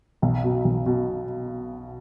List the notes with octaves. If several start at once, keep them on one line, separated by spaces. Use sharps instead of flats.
B1
B2
B1
B2